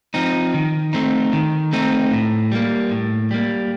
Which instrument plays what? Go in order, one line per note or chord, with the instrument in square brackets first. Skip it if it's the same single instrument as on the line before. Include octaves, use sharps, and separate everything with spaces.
[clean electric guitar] F3 C4 D#4
D#3
A3 C4 D#4
D#3
A3 C4 D#4
A2
G3 A#3
A2
G3 A#3